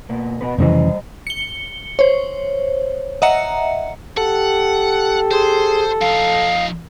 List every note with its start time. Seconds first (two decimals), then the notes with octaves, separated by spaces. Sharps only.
0.09 B2 A#3
0.41 B2 B3 B4
0.58 F1 C#3 E3 G3 C5 D#5
1.27 C#7 G7
1.99 C5 C#5
3.22 D#5 E5 F#5 A#5 C#7
4.18 G4 A4 F#5
5.31 G#4 C5 C6
6.01 F3 D#4 F5